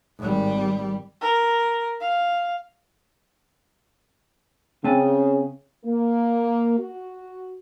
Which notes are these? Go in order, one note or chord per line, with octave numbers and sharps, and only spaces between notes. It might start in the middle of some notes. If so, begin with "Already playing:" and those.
G#1 G3
A#4
F5
C#3 C4 G#5 A5
A#3
F#4